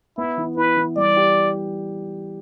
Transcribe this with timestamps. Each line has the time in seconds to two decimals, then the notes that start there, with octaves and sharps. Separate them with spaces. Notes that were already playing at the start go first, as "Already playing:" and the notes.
0.17 B3 E4
0.37 E3
0.56 E4 B4
0.76 E3
0.96 G3 D5
1.16 G4